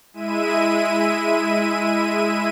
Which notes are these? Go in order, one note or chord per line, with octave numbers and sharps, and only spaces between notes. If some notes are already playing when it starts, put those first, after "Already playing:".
G#3 E4 E5 D#7